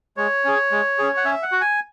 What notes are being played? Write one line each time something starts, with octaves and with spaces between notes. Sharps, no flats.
G#3 C#5
C#4 G#4
G#3
C#4 G#4
F#5
C#4 E5
F#5
F#4
G#5